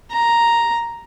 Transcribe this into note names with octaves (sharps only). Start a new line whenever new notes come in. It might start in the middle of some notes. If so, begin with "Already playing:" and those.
A#5